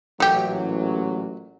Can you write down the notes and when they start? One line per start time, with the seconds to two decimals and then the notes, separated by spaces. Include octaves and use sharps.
0.20 A1 A#2 F#3 A3 G4